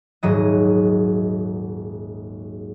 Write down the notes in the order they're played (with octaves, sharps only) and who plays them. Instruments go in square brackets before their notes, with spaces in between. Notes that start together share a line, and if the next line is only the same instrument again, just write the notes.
[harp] D#1 G#2 F#3 D#5